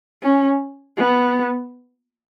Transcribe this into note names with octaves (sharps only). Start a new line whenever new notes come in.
C#4
B3